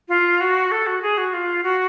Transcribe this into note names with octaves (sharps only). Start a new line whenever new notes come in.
F4
F#4
A4
F#4
G#4
F#4
F4
F#4